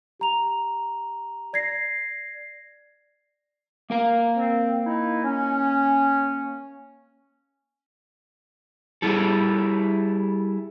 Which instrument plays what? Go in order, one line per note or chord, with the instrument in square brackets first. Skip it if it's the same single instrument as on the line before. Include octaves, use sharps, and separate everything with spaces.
[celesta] G4 A#5 F7
D5 G#6 A#6 C7
[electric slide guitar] A#3 A#4 F5
[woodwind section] C4
D#4 E4
C#4
[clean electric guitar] G3 E4 G#4 A4